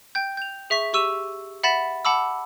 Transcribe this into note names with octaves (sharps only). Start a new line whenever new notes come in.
G5 G6
G6 F7
G#4 E5 C#6 B6
G4 C#6 E6 D#7 E7
E5 F#5 B5 A6 B6 E7
F#5 A5 B5 D6 E6